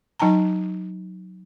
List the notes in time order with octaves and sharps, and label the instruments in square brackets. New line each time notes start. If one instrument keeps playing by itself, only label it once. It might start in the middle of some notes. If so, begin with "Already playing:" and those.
[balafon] F#3 D#4 G5 A5 A#5